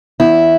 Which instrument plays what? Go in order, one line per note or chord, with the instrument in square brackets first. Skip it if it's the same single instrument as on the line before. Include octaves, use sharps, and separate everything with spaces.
[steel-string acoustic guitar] E2 E4